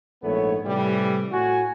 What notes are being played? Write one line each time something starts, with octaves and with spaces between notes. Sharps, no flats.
A#1 G#2 A3 B3 A4 C#5
A2 C3 E3 G3
A2 F#4 G#5